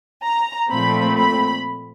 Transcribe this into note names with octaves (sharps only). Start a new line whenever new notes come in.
A#5
A#2 F3 A3 C4 B5
B5